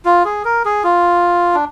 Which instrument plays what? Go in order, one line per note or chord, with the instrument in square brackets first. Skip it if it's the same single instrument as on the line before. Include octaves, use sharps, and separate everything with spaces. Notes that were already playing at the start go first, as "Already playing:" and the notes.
[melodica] F4
G#4
A#4
G#4
F4
D4